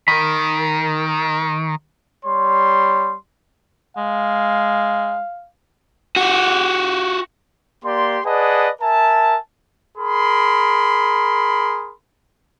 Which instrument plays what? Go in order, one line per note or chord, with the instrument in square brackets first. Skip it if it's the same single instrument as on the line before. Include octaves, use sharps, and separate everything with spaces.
[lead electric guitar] D#3 [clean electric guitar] A#4 B5
[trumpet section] G3 C#5 C6
[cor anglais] G#3 [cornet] F5
[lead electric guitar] F#4 G4
[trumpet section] A#3 G4 D5 C6
G#4 B4 D5 D#5 F#5 A5
A#4 E5 G#5 A5
G#4 A#4 B5 C6